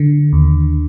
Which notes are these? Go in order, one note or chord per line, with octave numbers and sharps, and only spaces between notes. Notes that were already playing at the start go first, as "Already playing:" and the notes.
Already playing: D3
D#2